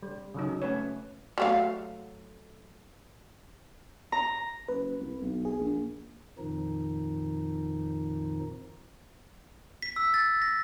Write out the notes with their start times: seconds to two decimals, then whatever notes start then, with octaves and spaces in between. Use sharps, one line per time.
0.03 G3
0.35 C#3 F#3 D#4
0.62 A3 C#4 B4 C#5
1.38 F#3 A3 F5
4.12 A#5
4.68 F#1 B4
5.00 C2
5.22 B1
5.45 G#4
5.60 A#1
6.38 F2 A#2 D#3 F3 D#4
9.82 B6
9.96 E6
10.14 A6
10.42 A#6